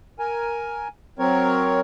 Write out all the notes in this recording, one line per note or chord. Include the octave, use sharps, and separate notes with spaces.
A#4 G#5
F#3 C4 A#4 C#5